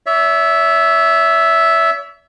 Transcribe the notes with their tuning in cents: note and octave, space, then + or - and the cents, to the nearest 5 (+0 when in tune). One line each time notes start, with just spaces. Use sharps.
C#5 +45 E5 +0